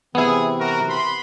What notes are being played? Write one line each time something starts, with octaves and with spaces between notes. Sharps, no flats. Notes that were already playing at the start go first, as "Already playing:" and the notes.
C3 E3 B3 C4 E4 G#4
F#4 A#4
B3 B5 C6